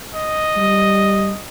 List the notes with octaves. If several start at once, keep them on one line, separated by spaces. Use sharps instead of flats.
D#5
G3